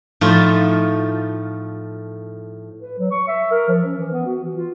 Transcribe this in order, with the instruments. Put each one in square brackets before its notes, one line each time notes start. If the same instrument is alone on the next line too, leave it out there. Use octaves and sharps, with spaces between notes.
[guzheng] A2 F3 A3 D#4 F4
[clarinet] B4
F#3
C#6
E5
A#4
F3
C#4
E3
B3
F#4
E3
F4